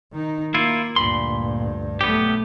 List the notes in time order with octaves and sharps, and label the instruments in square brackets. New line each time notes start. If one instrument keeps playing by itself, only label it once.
[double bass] D#3 D#4
[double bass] A#3 [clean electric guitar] E4 F4
[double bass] D2 G2 [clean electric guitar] A#2 B5 C6
[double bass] B1 A3 [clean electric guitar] B3 G4